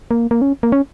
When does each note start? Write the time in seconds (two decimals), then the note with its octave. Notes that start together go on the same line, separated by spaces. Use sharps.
0.11 A#3
0.31 A#3
0.42 C#4
0.63 A#3
0.72 C#4